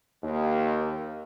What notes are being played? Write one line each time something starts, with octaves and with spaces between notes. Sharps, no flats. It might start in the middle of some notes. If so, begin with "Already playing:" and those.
D#2